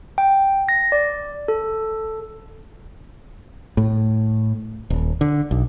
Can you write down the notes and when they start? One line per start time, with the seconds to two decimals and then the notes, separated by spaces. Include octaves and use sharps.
0.18 G5
0.69 A#6
0.92 D5
1.48 A4
3.77 A2
4.90 D#1
5.21 D3
5.51 B1